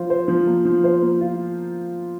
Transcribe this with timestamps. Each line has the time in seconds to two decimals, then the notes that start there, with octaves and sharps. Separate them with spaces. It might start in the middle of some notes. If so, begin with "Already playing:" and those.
Already playing: F3 F4 C5
0.10 C5
0.28 F3
0.47 A#3
0.65 F3
0.84 C5
1.02 A#3
1.21 F4